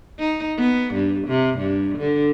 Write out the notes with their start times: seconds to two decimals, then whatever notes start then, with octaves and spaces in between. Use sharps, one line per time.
0.19 D#4
0.57 B3
0.94 G2
1.28 C3
1.58 G2
1.98 D3